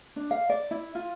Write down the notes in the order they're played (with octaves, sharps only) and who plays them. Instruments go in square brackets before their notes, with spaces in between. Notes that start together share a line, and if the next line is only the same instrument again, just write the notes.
[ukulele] D4
F5
D5
E4
F4